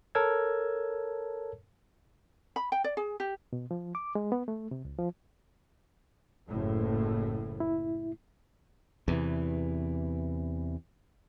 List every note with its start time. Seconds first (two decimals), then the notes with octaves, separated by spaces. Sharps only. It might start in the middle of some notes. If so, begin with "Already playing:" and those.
0.15 A4 A#4 C#5 A5 E6 G#6
2.56 B5
2.72 G5
2.84 D5
2.97 G#4
3.20 G4
3.53 B2
3.71 F3
3.95 D6
4.15 G#3
4.32 B3
4.48 A3
4.71 C3
4.85 C#2
4.99 F3
6.49 F#1 A2
7.60 E4
9.08 E2 C3 E3